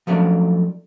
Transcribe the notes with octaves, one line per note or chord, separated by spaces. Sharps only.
F3 F#3 A3 C#4 D4